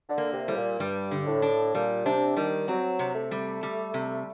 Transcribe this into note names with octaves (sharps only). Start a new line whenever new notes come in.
D3
A#3
C3
A2 G3
A#2
G2 G3
D3
A2
D4
A#2 G3
C3 D4
D#3 G3
F#3 C4
C3
A3
G3
G3
C3